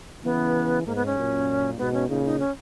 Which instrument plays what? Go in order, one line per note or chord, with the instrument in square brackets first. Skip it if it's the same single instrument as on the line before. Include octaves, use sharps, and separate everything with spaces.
[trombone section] C#3 E3 [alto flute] B3
[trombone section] G#2 [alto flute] A#3
[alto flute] B3
C#4
[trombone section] F#2 A#2
[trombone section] G#2 B2 [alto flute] B3
[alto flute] C#4
[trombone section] A#2 C#3 [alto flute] D#4
[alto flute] D#4
C#4